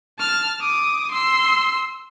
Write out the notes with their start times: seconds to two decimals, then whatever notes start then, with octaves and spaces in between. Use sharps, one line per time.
0.19 A5 F6
0.61 D6 D#6
1.12 C6 E6